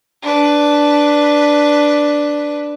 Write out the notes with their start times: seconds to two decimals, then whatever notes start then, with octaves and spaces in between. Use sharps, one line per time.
0.22 D4 B4